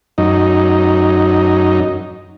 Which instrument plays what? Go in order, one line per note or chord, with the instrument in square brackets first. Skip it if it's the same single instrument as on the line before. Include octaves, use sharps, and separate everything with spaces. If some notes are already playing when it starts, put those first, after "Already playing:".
[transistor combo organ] F#2 D#4